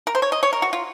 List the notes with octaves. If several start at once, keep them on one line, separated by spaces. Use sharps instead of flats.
A#4
C5
C#5
D#5
C#5
A#4
F#4
F4